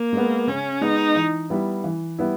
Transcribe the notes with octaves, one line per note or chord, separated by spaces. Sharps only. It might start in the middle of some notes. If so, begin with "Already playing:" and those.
Already playing: A#3
G#3 B3
C#3 C#4
G#3 B3 D#4
E3
G3 B3 E4
E3
G3 B3 E4